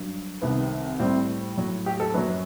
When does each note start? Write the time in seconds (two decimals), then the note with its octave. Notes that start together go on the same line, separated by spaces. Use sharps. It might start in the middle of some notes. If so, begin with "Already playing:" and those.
Already playing: G2 F#3
0.42 C2 C3 D#3 B3
0.99 A2 G3 C4
1.57 A2 F#3
1.86 G4
2.00 A4
2.14 F#2 F#3 B4